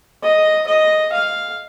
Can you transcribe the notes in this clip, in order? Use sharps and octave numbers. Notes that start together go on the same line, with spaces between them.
D#5
D#5
F5